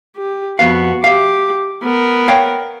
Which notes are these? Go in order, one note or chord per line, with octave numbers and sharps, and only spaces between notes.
G4
F2 B3 F#4 F5
G4 E5 F5 D6
B3 A#4
C#5 F5 G5